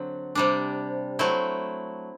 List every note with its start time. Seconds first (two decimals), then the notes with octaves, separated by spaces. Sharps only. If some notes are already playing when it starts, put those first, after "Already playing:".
Already playing: D3 F#3 C4
0.35 C3 G3 D4
1.19 F#3 A3 C4 E4